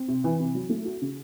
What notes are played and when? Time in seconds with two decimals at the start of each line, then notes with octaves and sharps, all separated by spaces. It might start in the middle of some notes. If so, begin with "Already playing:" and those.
Already playing: C4
0.08 C3
0.24 E3
0.40 C3
0.55 F#3
0.69 A3
0.85 F#4
1.02 C#3